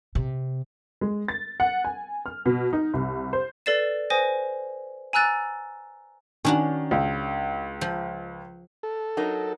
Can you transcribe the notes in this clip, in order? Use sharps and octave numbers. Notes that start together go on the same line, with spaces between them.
C3
G#3
A6
F#5
G#5
F6
B2
D#4
C2
C5
A4 B4 D5 A6 C7 E7
B4 C5 G5 G#5 D#6 A#6
G#5 A#5 E6 F#6 A6
D#3 C#4 D4 F#4
C#2
F3
A4
F#3 D#4 A#4